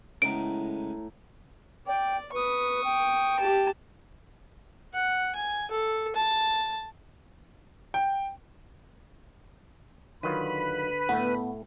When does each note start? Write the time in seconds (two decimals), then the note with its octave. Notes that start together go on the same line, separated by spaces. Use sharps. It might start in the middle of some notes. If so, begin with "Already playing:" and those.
0.22 A2 C#3 G#3 B3 A#5 D7
1.87 D5 G5
2.33 B4 C#6 D#6
2.84 G5
3.39 G4 A5
4.94 F#5
5.35 G#5
5.71 A4
6.15 A5
7.94 G5
10.23 D3 D#3 F#3 F4 B4 B5
11.09 A2 A3 B3